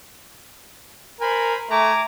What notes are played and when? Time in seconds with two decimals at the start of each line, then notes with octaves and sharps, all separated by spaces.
1.21 A#4 C5 G#5 B5
1.70 A3 G#5 A#5 D6